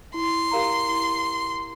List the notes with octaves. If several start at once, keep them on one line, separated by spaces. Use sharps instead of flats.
E4 C6
G4 A#4 F5 A#5
E4